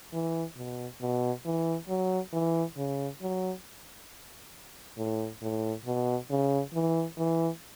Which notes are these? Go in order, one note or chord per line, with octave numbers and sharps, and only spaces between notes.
E3
B2
B2
E3
F#3
E3
C#3
F#3
A2
A2
B2
C#3
E3
E3